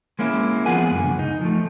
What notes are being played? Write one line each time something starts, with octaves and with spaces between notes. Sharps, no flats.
G#3 A#3 C#4 E4
F3 B3 F4 G#4 F#5 G#5
F#2 D3
C#2
D#4
F3 A3